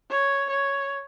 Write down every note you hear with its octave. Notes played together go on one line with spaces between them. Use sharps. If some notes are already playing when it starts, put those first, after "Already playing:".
C#5
C#5